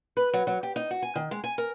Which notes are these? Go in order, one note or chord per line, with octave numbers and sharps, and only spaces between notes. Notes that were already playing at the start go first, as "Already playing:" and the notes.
B4
F#3
F#3
G4
D#4
F#4
G#5
D#3
G#3
G#5
A#4